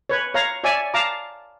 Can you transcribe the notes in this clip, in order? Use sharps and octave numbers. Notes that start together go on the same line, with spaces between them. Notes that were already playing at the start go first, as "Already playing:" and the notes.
B4 C#5
C#5 F5 A#5
C#5 D5 E5 G#5
F5 A5 A#5 D6